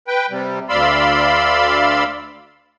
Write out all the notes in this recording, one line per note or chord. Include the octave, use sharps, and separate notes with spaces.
B4 G5
C3 G3
D2 D5 F5 B5 C6 E6